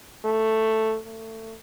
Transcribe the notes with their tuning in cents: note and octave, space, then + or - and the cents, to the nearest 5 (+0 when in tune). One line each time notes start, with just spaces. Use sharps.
A3 +5
A3 +25